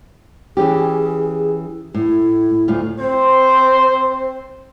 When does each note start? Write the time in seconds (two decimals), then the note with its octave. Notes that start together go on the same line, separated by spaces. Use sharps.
0.57 E3 C#4 G4 G#4
1.94 A2 E4
2.68 D2 A2 F4
2.99 C4 C5